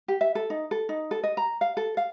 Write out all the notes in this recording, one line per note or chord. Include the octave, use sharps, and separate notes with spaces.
G4
E5
A4
D#4
A4
D#4
A4
D#5
A#5
F5
A4
F5